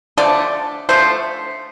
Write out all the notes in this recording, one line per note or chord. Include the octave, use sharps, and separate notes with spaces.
D3 F3 A3 D5
D3 F3 A3 C5